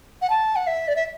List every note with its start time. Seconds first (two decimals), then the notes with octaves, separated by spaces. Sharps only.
0.22 F#5
0.30 A5
0.56 F#5
0.67 E5
0.88 D5
0.96 E5